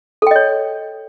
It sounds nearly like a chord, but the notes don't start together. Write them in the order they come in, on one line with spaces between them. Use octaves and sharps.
A4 G5 D#5 C#5